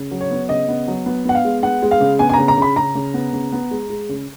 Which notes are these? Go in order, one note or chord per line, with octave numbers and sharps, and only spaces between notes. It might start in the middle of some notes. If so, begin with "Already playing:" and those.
Already playing: C#3
F#3
C#5
B3
C#3 D#5
B3
F#3
B3
B3 F#5
F5
G#3
B3 F#5
G#3
F5
C#3
B3 G#5
G#5
C#3 A#5
A#5
C#3 B5
C#3 A#5
C#3
B3
C#3
B3
G#3
G#3
C#3